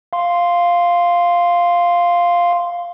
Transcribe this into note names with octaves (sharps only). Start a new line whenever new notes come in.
F5 C6